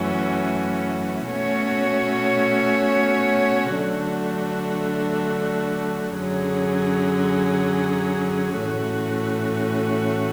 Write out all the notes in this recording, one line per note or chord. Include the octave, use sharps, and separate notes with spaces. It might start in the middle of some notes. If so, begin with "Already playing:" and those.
Already playing: F#2 E3 A3 C#4 F#4
B2 A3 C#4 F#4 C#5
D3 F#3 A3 D4 F#4
F#2 D3 F#3 C#4 G#4
A2 E3 A3 C#4 F#4